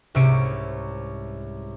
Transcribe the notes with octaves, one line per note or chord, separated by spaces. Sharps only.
C2 G#2 C3 C#4 C#7 D7